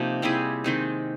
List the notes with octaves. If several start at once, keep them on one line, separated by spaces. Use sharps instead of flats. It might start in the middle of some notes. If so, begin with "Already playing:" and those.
Already playing: C3 F3 A#3 D#4
G3 C4 E4 G#4
D#3 G#3 C4 D#4